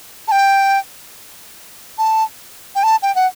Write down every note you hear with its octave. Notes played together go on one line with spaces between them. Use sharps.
A5
G5
A5
G5
A5
G5
F#5